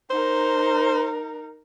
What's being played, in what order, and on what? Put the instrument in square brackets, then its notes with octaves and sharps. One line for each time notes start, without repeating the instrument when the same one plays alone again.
[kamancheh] D#4 A#4 [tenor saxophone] C5